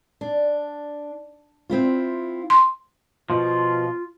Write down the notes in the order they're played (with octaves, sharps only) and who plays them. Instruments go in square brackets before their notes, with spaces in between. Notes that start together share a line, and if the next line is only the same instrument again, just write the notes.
[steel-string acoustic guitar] D4
C4 E4 F4
[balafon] C6
[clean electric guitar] B2 F3 [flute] F4